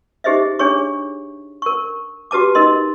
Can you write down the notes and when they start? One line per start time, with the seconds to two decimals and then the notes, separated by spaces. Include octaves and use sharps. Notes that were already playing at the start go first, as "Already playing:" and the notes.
0.24 D#4 G4 G#4 C5 D#5 E5
0.59 D4 G#4 C#5 C#6
1.62 A#4 C#6
2.31 F#4 G4 B4 A5 D6
2.55 D#4 A#4 D#5 C6